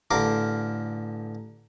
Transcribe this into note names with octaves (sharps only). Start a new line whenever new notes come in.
A1 D3 A#4 F5 D6